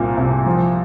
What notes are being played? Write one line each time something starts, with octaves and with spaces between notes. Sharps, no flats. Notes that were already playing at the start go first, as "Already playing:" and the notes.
Already playing: C2 A#2 C4
C2
F3